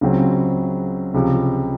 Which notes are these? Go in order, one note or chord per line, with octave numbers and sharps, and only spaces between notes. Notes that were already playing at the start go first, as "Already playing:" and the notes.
C#2 C#3 F#3 C4
C#2 C3 F3